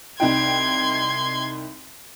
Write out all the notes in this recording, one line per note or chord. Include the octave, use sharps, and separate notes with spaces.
C2 D#4 G5 C6 G#6